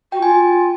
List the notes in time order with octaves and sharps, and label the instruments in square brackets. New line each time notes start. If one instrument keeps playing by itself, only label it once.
[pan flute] F#4 [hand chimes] G5
[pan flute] F4 [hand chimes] G#5